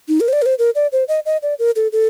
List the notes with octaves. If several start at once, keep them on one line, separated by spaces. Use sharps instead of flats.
D#4
A#4
C5
D5
A#4
C5
A#4
D5
C5
D#5
D#5
D5
A#4
A4
A4